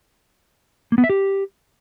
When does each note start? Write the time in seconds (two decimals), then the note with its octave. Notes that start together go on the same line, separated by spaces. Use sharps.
0.92 A#3
0.98 B3
1.04 E5
1.10 G4